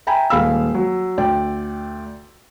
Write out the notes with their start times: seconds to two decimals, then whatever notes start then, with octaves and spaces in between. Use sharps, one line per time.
0.07 E5 G5 G#5 A#5 B5
0.30 D#1 G#3 F5 B5 E6
0.74 F#3
1.18 D2 D5 G5